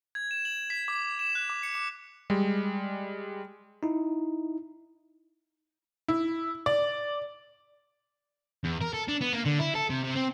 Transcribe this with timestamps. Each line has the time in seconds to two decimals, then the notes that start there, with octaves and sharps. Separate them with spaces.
0.15 G#6
0.31 E7
0.45 F#7
0.70 B6
0.88 D6
1.19 E7
1.35 F#6
1.50 D6
1.63 C#7
1.75 D6
2.30 G3 G#3
3.83 D#4 E4
6.08 E4
6.66 D5
8.65 E2
8.82 A#4
8.94 A4
9.08 D4
9.21 B3
9.33 A#3
9.45 D3
9.59 E4
9.75 A4
9.90 C3
10.04 C3
10.15 C4